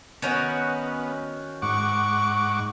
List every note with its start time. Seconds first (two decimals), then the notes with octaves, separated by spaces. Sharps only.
0.22 D#3 B3 C#4 F#4
1.62 G#2 F#5 C#6 D6